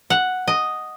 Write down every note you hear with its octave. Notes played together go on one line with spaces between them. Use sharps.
F#5
D#5